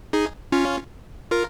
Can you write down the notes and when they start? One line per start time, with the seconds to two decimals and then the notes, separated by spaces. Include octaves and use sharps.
0.13 D#4 G#4
0.52 C#4 F4
1.31 F4 A#4